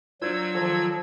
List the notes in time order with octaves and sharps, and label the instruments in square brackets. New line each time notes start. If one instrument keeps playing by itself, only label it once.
[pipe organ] F#3 E6 G#6 [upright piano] D4 F4 C5
[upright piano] D#3 A4 [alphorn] F3